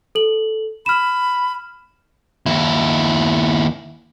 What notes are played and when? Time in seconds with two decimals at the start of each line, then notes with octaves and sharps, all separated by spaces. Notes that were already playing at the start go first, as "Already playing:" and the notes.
0.15 A4 F#7
0.86 B5 F6 E7
2.46 D#2 E4